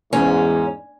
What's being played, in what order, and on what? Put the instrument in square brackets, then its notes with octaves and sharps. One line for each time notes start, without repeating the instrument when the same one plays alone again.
[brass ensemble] E2 G#2 [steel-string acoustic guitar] C#4